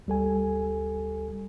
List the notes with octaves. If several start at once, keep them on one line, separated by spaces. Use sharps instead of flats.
D2 G3 A4 G#5